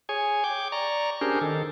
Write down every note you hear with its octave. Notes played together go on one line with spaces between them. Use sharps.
G#4 C#5 G#5
G5 D6
D5 A#5 C#6
C#4 D4 G4 G#4 A#4 C5
D#3 A4